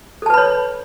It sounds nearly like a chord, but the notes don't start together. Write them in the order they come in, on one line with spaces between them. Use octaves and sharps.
A4 A5 B4 B5 C#5